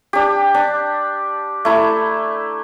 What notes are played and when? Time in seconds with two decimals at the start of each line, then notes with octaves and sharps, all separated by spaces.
0.13 D4 G4
0.55 D4
1.65 A3 E4 A#5